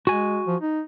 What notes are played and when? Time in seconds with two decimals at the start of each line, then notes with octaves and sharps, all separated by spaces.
0.07 G#3 F#4 G#5
0.47 F3
0.61 D#4